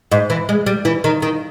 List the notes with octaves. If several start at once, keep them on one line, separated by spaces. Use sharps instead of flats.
G#2
E3
G#3
G3
E3
D#3
D#3